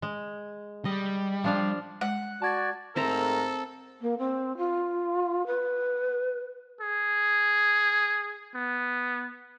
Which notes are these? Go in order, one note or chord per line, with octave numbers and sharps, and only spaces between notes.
G#3
G3 D#5
F3 D4 F5
G#3 F#5
F#4 D5 A5 G#6 A6
G#2 A3 C4 A4 A#4 E5 A#5
A#3
C4
F4
B4
G#4
B3